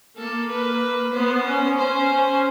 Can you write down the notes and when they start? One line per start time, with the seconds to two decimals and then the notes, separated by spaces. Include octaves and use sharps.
0.17 A#3 A4
0.49 B4
1.13 B3 C5
1.46 C#4
1.77 C#4 C5